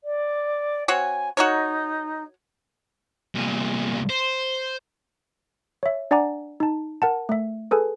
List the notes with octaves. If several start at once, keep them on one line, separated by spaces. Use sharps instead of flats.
D5
C4 F#4 C#5 G#5
D#4 F#4 A#4 C#5
C2 A#2
C5
C#5 E5
D4 D5 F#5 G#5 A#5 D6
D#4 A5
A#4 F#5 A5
A3 E5
G#4 A4 B4 G#5